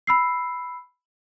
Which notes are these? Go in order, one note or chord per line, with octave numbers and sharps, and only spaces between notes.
B5 E6 C7